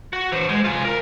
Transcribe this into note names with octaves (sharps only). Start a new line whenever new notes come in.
F#4
E3 C5
G#3
F4 G#5
A#4